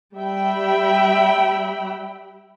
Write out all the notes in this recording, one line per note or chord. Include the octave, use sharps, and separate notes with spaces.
G3 E5 G5 B5